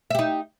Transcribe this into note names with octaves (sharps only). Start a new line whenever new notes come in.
D#4 G4 E5